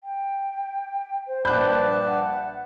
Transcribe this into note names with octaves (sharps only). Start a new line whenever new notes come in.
G5
C5
A#1 G2 C5 D5 A5 B5 F#6 G6
F#5